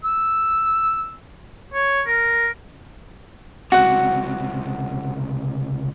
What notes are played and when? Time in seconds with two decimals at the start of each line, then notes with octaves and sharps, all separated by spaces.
0.04 E6
1.73 C#5
2.06 A#4
3.72 C#2 C3 F#4 F#5